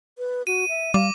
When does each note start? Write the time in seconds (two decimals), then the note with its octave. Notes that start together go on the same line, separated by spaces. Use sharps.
0.18 B4
0.47 F#4 D#7
0.69 E5
0.94 G3 F5 D6